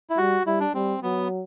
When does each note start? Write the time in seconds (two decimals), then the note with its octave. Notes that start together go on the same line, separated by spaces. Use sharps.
0.10 E4
0.18 G3 F#4
0.46 G3 E4
0.60 D4
0.74 G3 C4
1.03 F#3 B3